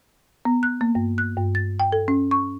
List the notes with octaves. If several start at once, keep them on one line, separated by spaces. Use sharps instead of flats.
B3
F#6
A#3
G2
F#6
G2
A6
G5
A4
C#4
C#6